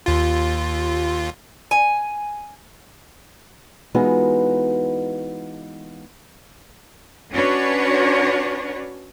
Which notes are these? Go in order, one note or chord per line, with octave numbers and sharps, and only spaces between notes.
D#2 F4
G#5
E3 G#3 B3 D#4 F4 F#4
C#4 D4 F#4 B4 C#5